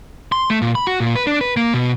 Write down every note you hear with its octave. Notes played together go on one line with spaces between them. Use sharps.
C6
A3
A#2
B5
F#4
A#2
B4
D4
B4
A#3
B2